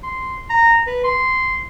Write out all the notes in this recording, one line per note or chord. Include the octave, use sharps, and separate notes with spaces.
C6
A#5
B4
C6